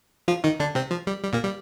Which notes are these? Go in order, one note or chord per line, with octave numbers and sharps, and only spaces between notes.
F3 F4
D#3 D#4
D3 D4
C3 C4
F3
G3
G3
A#2 A#3
G3